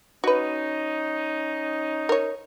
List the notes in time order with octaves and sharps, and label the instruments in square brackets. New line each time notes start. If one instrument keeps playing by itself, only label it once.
[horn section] C#4 D#4 [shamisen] F#4 B4
[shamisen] A#4 C#5